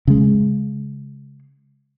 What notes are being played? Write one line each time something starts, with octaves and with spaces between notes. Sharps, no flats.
C#3 G#3